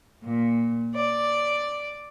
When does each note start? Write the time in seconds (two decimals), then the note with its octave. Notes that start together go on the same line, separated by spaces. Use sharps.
0.23 A#2
0.96 D5